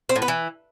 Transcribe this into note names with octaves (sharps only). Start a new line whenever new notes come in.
C4
A2
B3
E3